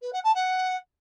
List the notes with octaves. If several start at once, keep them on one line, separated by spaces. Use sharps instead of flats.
B4
F#5
A5
F#5